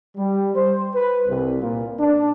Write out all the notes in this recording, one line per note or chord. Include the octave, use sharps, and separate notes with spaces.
G3
C5
B4
C2
A#2
D4